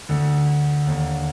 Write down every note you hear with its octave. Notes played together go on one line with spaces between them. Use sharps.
D2 D3
D#2 D3